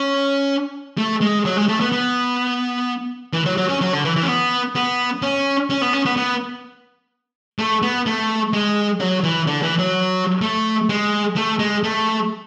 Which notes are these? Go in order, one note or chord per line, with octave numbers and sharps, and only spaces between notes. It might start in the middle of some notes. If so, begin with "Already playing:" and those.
Already playing: C#4
A3
G#3
F#3
G#3
A3
B3
B3
E3
F#3
F#3
C#4
F#3
D3
E3
E3
C#4
B3
B3
C#4
C#4
B3
C#4
B3
B3
A3
B3
A3
G#3
F#3
E3
D3
E3
F#3
A3
G#3
A3
G#3
A3